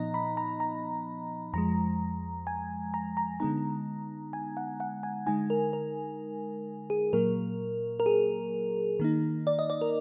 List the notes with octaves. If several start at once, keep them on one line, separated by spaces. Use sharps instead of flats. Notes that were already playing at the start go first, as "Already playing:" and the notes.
Already playing: A#2 F3 B3 D#4 D#5 A#5
B5
A#5
A#5
F2 F3 G#3 A#5
G#5
A#5
A#5
D3 G#3 B3 D#4 A#5
G#5
F#5
F#5
G#5
D3 G#3 D#4 G#5
A#4
A#4
G#4
A#2 F#3 A#3 A#4
A#4
G#4
D#3 A#3 D#4
D5
D#5
D5
A#4